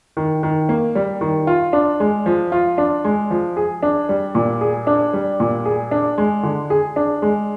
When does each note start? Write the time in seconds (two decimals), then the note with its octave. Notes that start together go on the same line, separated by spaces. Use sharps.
0.17 D#3
0.43 D#3
0.69 A#3
0.95 G3
1.21 D#3
1.47 F4
1.73 D4
2.00 G#3
2.26 F3
2.52 F4
2.78 D4
3.04 G#3
3.30 F3
3.57 G#4
3.83 D4
4.09 G3
4.35 A#2
4.61 G#4
4.87 D4
5.13 G3
5.40 A#2
5.65 G#4
5.91 D4
6.18 G#3
6.43 D3
6.70 G#4
6.96 D4
7.22 G#3